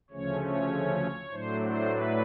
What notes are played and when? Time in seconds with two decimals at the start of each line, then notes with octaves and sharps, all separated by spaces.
0.10 D2 C#3 F3 A3 C#4 C#5
0.41 C#5
1.30 A2 F#3 A3 D4 C5
1.61 C5
1.91 B4